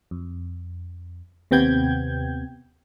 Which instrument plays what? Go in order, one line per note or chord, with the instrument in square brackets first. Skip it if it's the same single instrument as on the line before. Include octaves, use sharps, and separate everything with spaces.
[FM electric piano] F2
D#2 C3 B3 G5 G6 G#6